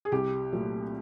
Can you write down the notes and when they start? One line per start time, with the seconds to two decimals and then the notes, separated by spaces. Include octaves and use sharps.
0.05 G#4
0.12 C2 G4
0.52 A#2 F#3 A3